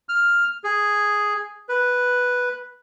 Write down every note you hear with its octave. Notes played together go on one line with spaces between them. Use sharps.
F6
G#4
B4